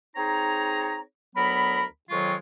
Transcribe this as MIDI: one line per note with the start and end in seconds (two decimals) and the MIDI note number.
0.16 0.99 60
0.16 0.99 63
0.16 0.99 68
0.16 0.99 73
0.16 0.99 82
1.35 1.84 38
1.35 1.84 54
1.35 1.84 59
1.35 1.84 70
1.35 1.84 83
2.10 2.34 41
2.10 2.34 51
2.10 2.34 54
2.10 2.34 56
2.10 2.34 65
2.10 2.34 85